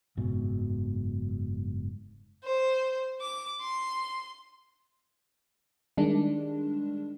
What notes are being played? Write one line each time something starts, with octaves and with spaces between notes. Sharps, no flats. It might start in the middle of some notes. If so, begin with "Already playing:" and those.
F#1 G#2 B2
C5
D6
C6
D#3 G3 G#3 D4